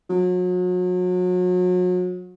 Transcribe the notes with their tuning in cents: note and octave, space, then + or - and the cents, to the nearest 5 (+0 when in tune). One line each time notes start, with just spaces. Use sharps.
F#3 -35